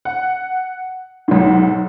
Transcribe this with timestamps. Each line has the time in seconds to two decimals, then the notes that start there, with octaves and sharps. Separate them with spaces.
0.05 F#5
1.28 B1 G#2